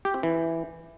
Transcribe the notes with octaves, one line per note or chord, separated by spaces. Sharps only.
G4
C4
E3